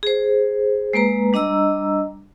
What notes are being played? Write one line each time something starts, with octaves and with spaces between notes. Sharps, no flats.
G#4 C5
G#3 A#3 B4 A#5
G3 D4 D#5 A#5 E6